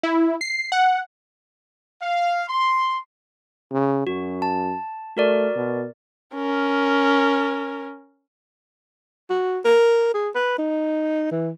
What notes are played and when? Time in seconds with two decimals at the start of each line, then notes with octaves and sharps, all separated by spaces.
0.03 E4
0.41 C7
0.72 F#5
2.01 F5
2.48 C6
3.72 C#3
4.07 F#2 F#4
4.42 A5
5.17 A3 F#4 A#4 D5
5.56 B2
6.35 C#4 A#4
9.29 F#4
9.65 A#4
10.14 G#4
10.35 B4
10.58 D#4
11.31 E3